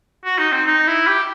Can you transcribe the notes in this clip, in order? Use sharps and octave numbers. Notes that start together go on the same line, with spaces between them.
F#4
D#4
C4
D#4
E4
G4